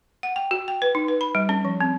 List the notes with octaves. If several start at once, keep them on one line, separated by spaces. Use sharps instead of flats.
F#5
G5
F#4
G5
B4
D#4
B4
B5
G3
C#4
F3
C4